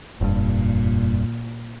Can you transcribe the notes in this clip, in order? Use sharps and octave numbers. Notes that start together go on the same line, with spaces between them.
F1 G2 A#2